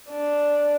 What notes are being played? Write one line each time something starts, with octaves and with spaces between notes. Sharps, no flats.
D4